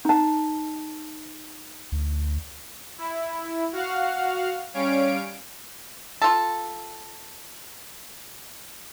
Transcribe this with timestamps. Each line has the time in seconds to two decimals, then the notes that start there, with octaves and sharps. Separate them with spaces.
0.05 D#4 A5
1.92 D2
2.98 E4
3.73 F#4 F5 F#5 F6
4.74 G3 C#4 C#5 F5 D7
6.22 F4 A4